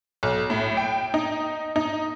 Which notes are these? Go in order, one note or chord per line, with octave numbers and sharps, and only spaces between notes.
B1
A2
G5
D#4
D#4